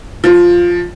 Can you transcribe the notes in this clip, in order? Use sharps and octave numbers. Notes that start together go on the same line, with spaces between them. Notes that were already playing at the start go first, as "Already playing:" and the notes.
F3